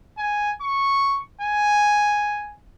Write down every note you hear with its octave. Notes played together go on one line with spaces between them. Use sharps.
G#5
C#6
G#5